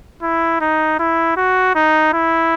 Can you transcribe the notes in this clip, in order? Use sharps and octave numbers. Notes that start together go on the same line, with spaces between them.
E4
D#4
E4
F#4
D#4
E4